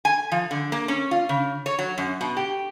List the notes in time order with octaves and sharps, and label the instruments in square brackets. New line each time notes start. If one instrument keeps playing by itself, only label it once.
[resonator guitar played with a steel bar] G#5
F3
D3
A#3
C#4
F4
C#3
C#5
F#3
F#2
B2
G4